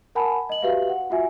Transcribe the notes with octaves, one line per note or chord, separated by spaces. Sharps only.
A#4 F#5 G#5 A5 B5
D#5 F#7
F#4 G4 B4 E5 F5
F#5
F4 F#4 E5 G#5